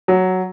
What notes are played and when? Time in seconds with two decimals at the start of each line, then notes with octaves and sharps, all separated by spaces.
0.08 F#3